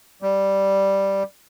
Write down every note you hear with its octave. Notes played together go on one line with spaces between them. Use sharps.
G3